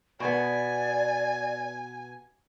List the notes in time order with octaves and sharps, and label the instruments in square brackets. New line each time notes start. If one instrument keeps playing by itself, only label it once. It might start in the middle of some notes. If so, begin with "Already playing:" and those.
[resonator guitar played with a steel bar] B2 B3 [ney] D5 [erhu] G#5